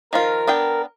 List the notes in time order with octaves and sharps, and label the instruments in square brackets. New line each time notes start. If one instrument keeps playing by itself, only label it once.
[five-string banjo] D#3 F3 F4 [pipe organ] A#4
[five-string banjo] B3 D4 G5